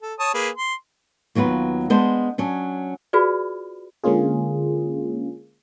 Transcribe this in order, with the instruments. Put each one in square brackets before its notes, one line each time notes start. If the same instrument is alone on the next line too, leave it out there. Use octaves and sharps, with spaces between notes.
[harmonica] A4
C#5 A5 D#6
A#3 G#4 B4
C6
[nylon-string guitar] D#2 F#3 B3 F4 B4
G#3 B3 D4 C5
F#3 C#4 D4
[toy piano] F4 F#4 G#4 B4 D5
[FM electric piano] D3 G#3 A#3 C#4 F4 G#4